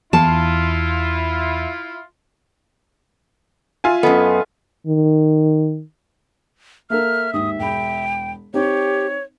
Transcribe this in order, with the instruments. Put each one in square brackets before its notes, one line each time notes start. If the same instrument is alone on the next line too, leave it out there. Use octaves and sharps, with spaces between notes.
[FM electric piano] E2 [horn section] E4 F4 [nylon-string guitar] A5
[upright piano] F4 E5 G#5
[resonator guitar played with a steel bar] F#2 B3 [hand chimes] A4 D#5
[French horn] D#3
[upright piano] A#3 A4 A#4 [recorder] E5 [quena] F6
[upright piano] G#1 D#2 [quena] D#6
[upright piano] E1 B5 [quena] G5
[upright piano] C4 D#4 [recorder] G4 [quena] C#5